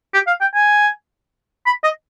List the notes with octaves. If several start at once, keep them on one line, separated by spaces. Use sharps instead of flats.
G4
F5
G5
G#5
B5
D#5